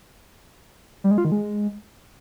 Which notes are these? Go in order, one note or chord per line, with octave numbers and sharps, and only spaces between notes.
G3
G#3
F4
D#3
G#3